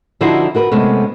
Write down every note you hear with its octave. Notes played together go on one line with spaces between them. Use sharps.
D3 F3 D#4 E4 F#4 C5
F#4 A#4 B4
C3 G#3 A3 B3 C#4